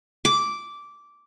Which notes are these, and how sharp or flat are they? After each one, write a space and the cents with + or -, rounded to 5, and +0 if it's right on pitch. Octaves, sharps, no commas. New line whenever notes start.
D6 -10